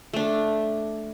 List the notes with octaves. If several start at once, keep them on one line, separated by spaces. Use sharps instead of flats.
A3 D4